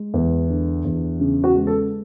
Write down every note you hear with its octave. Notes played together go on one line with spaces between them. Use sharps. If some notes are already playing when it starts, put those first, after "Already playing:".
Already playing: G#3
E2
D3
E2
C#3
F#4
G#3
A4